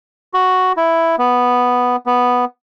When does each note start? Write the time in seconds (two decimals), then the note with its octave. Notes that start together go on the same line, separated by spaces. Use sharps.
0.34 F#4
0.77 E4
1.19 B3
2.06 B3